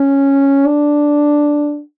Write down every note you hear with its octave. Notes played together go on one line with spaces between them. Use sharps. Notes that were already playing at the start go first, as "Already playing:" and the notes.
Already playing: C#4
D4